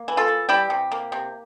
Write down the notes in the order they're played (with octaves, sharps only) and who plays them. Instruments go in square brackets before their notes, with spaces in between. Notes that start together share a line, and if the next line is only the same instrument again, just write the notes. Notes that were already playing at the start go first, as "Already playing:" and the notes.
Already playing: [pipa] A#3
E3
F4 A4
E3
G3 E4 G4
C3
A#3
C3